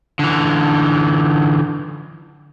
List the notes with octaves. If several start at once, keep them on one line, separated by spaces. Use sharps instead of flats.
D3 E3